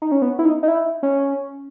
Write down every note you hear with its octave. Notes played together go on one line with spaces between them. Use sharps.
D#4
C#4
B3
E4
D#4
D#4
E4
C#4